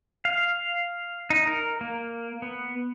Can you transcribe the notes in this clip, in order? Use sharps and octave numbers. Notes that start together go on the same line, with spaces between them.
F5
D#4
A#4
A#3
B3